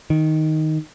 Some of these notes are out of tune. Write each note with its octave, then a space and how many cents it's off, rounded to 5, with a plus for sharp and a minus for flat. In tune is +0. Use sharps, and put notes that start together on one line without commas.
D#3 +5